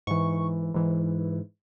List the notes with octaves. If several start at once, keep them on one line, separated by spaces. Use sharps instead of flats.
G#2 E3 C#6
G#2 E3